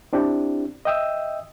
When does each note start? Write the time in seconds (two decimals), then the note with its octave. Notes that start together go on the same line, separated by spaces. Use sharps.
0.13 C4 D4 E4 G4
0.85 D#5 E5 G5 D#6 E6